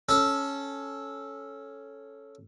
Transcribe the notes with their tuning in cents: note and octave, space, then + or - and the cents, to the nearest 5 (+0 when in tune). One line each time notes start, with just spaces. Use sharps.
C#4 +0 A4 -10